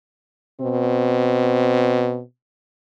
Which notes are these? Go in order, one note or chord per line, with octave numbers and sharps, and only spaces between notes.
B2 C4